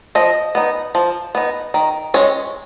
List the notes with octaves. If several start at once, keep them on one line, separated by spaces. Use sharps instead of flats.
F3 D#5
B3 D#4
F3
B3 D#4
D#3
G#3 C#4 C#5